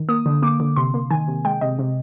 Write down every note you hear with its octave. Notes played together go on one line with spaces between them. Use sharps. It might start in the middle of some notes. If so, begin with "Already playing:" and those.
Already playing: D#3
A#3 D#6
D3
A#3 D6
D3
C3 C6
A#3
D#3 G#5
C3
G#3 G5
C3 D#5
C3